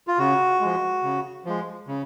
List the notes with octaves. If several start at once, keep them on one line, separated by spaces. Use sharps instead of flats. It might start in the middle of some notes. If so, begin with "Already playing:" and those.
F4
C#3 F#4
F3 G#3
C#3
F3 G#3
C#3